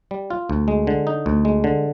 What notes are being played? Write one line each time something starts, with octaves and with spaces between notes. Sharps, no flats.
G3
F4
D2
G#3
D3
D#4
D2
G#3
D3